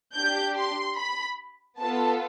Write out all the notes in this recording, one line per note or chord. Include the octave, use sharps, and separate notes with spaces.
D4 G4 G6
C6
B5
B3 F4 A4 A5